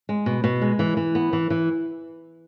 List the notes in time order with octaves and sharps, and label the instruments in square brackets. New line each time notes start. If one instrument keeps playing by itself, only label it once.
[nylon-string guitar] G#3
B2
B2
G#3
E3
E3
B3
E3
E3